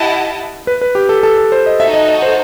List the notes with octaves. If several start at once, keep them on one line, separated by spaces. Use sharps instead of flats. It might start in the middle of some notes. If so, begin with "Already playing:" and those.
Already playing: E4 G4 D#5 F#5 A5
B4
B4
G4
A4
A4
A4
C5
D#5
D#4 F#4 A4 E5
D#5
D#5
C5